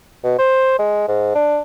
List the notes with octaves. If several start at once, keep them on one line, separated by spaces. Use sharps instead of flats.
B2
C5
G#3
G#2
D4